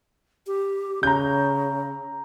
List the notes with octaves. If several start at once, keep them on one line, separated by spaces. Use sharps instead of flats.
G4
C#3 A#5 G6